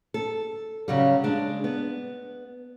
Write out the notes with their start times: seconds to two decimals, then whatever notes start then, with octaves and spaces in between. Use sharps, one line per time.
0.14 A4
0.88 C#3 F#3 G3
1.24 G#3 D4
1.64 B3